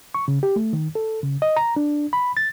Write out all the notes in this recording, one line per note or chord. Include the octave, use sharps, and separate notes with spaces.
C#6
C#3
G4
A3
D#3
A4
C#3
D#5
A#5
D4
B5
A6